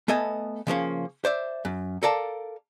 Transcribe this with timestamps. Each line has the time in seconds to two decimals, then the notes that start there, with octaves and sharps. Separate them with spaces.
0.08 A3 B3 A4 D#5 G#5
0.67 C#3 F3 A#3 C#4
1.25 C5 D5 E5
1.65 F#2
2.03 A4 A#4 D5 F5 A5